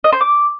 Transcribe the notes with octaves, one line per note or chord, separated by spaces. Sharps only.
D#5
C5
D6